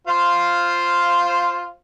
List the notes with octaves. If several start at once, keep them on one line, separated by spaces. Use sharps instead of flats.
F4 C5 F5